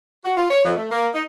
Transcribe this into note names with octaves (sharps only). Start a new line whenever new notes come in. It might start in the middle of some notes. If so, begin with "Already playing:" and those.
F#4
F4
C#5
F2
A3
A#3
D#4